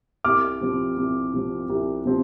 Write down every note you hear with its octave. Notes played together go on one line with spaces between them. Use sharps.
C2 D6 F6
C3 F3 C4
C2
C3 F3 C4
C2
C3 F3 C4